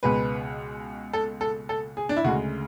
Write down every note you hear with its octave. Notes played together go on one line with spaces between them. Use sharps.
C#2 B2 G#3 B4
A4
A4
A4
G#4
D4
E4
D2 C#3 G#3 F#4